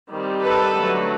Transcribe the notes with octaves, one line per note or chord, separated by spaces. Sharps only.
D#3 G3 C4
A4 B4
D3 F#3 A3